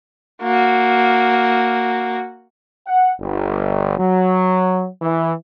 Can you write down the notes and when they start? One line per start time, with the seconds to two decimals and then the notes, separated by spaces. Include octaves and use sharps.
0.42 A#3 F#4
2.87 F#5
3.20 G1
3.98 F#3
5.02 E3